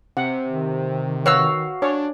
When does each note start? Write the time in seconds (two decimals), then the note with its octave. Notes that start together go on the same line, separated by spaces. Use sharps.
0.17 C3 F#5
0.48 D#3
1.26 F#4 B4 C#5 F5 E6
1.82 D4 C#5